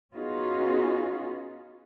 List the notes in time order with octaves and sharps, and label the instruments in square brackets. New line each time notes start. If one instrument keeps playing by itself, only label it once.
[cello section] B3 C#4 D#4 F4 F#4 G#4